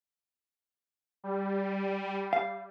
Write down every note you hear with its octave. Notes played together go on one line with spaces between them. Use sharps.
G3
F5